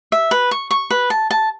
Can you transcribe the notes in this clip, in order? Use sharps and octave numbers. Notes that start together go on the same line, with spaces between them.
E5
B4
C#6
C#6
B4
A5
A5